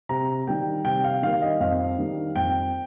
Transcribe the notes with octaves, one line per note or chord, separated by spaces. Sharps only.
C3 A#5
D#3 G3 A#3 G5
C3 G5
F5
D#3 G3 A#3 F5
D#5
F2 F5
D#3 G3 A#3
F2 G5